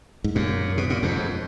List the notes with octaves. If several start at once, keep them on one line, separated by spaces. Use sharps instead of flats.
G#2
F#2 A#2
B2
A#2
F2 G#2